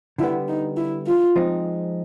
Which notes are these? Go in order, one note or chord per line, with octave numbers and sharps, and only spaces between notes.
D3 G3 B3 E4
D#4
E4
F4
F3 G#3 C4 D#4